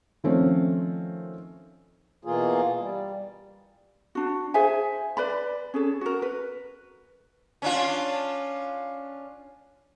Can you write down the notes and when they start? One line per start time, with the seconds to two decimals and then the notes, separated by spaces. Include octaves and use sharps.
0.24 D#3 F3 A3 C4 C#4
2.25 B2 E3 A#3 F4 G#4
2.80 G3
4.15 D4 F#4
4.54 G#4 C5 E5 G#5
5.17 B4 D5 B5
5.74 C#4 G#4 A4
6.01 F#4 A#4
6.22 B4
7.62 C#4 D4 F4